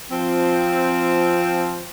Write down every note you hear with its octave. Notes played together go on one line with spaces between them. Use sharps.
F3 C4